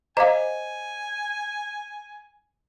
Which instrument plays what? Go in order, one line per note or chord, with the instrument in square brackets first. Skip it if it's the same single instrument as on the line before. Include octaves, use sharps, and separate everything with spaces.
[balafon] C5 D#5 D6 [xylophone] F5 A#5 [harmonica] G#5